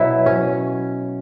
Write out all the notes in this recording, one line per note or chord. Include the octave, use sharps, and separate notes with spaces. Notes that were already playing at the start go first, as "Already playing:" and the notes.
Already playing: B2 F#3 E4
C#4